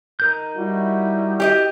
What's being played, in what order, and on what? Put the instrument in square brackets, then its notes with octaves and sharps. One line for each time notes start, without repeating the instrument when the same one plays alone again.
[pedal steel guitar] D#4 A#4 G6
[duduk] G3 [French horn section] E4 F#4
[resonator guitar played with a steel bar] G4 D5 D#5